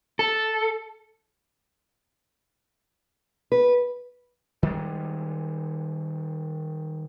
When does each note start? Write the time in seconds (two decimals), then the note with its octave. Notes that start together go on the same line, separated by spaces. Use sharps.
0.19 A4
3.52 B4
4.63 D#3 G3 G#3